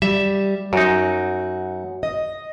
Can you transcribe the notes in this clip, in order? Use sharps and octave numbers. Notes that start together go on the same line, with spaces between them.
G3 E5
F#2 D#4 F#4
D#5